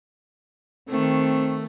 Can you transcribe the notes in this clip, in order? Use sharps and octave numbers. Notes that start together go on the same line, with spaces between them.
D#3 A3 C4